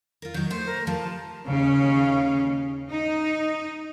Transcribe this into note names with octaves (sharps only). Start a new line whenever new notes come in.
F4 A#4
D#3 F#3 G6
A3 C5
A#4
F3 G4 A5
D#2 C#3 C#4 F5
D#4